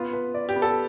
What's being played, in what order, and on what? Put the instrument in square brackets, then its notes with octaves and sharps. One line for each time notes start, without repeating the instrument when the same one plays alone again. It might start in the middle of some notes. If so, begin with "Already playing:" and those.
Already playing: [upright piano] B3 F4 B4
B4
D5
[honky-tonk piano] G4
[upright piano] B3
[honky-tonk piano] A4